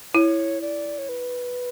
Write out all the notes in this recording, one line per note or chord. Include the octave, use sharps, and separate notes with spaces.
E4 C#5
D5
C#5
B4